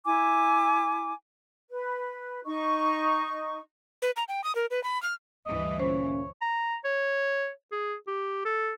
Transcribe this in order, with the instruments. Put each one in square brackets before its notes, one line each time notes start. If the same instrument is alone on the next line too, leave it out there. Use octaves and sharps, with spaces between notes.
[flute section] E4 G#5 D6
B4
D#4 C#6
[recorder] B4
A#5
G5
D#6
A#4
B4
B5
F6
[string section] D2 G2 E3 [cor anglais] D#5
[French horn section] A#2 C#4 [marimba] C5 [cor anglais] C#5
[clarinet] A#5
C#5
G#4
G4
A4